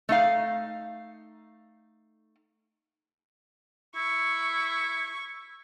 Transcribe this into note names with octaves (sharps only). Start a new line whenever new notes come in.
A3 D#4 F5
E4 C#6